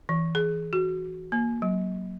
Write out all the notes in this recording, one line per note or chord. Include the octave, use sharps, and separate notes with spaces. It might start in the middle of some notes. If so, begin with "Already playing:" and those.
E3
G#4
F#4
A#3
F#3